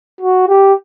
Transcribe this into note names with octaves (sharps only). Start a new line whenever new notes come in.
F#4
G4